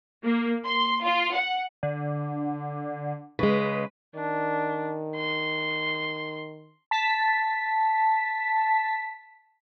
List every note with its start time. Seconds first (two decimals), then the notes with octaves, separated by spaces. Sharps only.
0.23 A#3
0.64 C6
1.04 F4
1.35 F#5
1.83 D3
3.39 C#3 G#3 B4
4.15 D#3 D4
5.16 C6
6.91 A5 B6